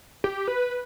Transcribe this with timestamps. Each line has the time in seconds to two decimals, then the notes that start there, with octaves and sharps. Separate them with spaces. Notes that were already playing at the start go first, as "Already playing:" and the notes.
0.24 G4
0.48 B4